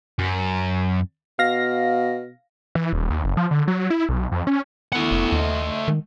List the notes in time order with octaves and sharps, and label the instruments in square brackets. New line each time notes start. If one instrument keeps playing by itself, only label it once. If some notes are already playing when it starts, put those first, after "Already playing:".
[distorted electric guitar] F#2
[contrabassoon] B2 [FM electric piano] F5 A#6
[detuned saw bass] E3
D#1
D#2
F#1
F3
D3
F#3
E4
B1
F2
C#4
[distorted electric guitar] A3 F#5 [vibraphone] B3 E4 C#6
[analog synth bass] F1
[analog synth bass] D#2 [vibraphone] D#5 E5 C6
[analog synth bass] D#3